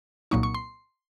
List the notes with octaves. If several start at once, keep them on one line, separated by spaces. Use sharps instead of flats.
C2 A#2 F#3 A#3 D#4 C#6
C#6
C6